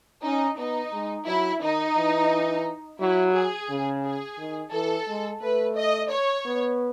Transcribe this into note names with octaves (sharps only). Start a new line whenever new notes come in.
C#4 D#4
B3 D#4
G#3
F#3 E4
D#3 D#4
E3
F#3 E4
G#4
C#3
G#4
D#3
E3 A4
G#3
A3 B4
D#5
C#5
B3